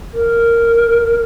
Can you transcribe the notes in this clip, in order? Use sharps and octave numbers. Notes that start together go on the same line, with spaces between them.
A#4